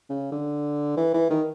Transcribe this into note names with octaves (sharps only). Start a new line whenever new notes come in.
C#3
D3
E3
E3
D#3